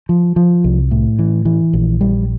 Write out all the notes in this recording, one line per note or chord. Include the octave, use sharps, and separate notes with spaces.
F3
F3
C2
A2
E3
E3
A#1
G3